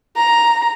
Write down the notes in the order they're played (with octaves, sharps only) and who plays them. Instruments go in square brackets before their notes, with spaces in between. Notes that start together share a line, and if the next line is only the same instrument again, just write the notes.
[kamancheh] A#5